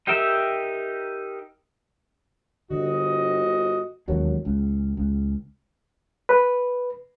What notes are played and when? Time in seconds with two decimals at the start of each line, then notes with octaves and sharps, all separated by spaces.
0.07 D#4 G4 A#4 E5 G5
2.70 G1 D3 C4 F#4 D#5
4.08 E1 D#2 F#3 A#3
4.45 C#2
4.97 C#2
6.29 B4